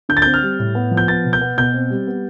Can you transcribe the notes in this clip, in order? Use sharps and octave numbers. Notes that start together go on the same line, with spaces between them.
D3 G6
A6
C4 G6
F6
G3
A2
B3
F3
G6
B3 A6
B2
G6
B3
B2 G6
C4
G3
B3